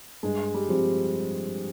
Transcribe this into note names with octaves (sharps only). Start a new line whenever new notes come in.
G2 G#3
G3
F3 C4 G4